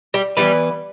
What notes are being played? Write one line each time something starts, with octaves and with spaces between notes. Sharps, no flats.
G3
E3 G3 B3 E4 B4